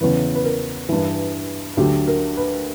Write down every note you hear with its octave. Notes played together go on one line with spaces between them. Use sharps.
E2 C#3 E3 B4
B4
A#4
G2 E3
D2 D3 F#3 G4
A#4
B4